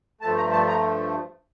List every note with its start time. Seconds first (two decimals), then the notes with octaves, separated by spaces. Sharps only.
0.21 G2 F3 A3 A5
0.37 A#5
0.52 A5
0.68 A#5